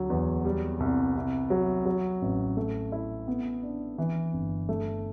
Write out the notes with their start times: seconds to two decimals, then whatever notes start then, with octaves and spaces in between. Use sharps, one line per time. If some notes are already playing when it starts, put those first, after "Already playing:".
Already playing: D2 F#3
0.10 E2
0.45 G3
0.80 C2
1.16 C3
1.50 F#3
1.85 F#3
2.22 A1
2.57 A3
2.92 E4
3.28 B3
3.63 D4
3.98 E3
4.34 G1
4.69 A3